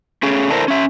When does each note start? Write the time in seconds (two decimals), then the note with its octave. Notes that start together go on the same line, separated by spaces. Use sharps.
0.23 A3 C#4 G#4
0.50 D3 D4 E4 A4 A#4 C5
0.68 C#4 E5